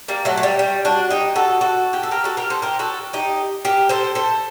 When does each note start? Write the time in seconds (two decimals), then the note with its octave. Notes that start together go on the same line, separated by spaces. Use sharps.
0.08 G3 A#3
0.25 F#3 A3
0.37 A3
0.43 G3
0.59 G3
0.85 D4 F#4
1.10 D#4 G4
1.36 F#4 A4
1.61 F#4 A4
1.93 G4
2.03 A4
2.11 G4 A#4
2.24 F#4 A4
2.37 G4 A#4
2.50 A4 C5
2.62 G4 A#4
2.79 F#4 A4
3.13 D#4 G4
3.65 G4 A#4
3.89 A4 C5
4.15 A4 C5